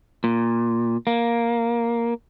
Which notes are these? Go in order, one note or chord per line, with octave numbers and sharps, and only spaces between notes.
A#2
A#3